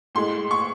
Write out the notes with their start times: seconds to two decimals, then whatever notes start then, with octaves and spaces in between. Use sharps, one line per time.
0.15 A2 G#3 C6
0.51 C#6